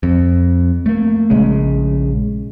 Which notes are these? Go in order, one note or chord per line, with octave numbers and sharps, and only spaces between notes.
F2
A3 A#3
A#1 C#3 G#3